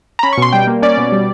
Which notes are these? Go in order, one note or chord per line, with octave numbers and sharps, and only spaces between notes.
A#5
C#4 B5
C#6
B2 C6
G3 G5
A#3
C#4 D5
B2
G3